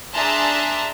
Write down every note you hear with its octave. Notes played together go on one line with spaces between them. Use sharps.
D4 G#4 E5 A5 A#5 C6